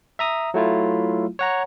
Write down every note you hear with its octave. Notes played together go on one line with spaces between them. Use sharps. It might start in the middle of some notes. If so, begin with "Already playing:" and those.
E5 A#5 D#6
F#3 A3 E4 F4
C#5 F#5 A#5